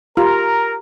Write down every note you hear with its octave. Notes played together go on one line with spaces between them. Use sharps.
F4 G4 A#4 A#5